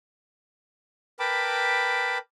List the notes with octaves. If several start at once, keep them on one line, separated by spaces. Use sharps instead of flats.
A#4 B4 G5 A5 B5 D6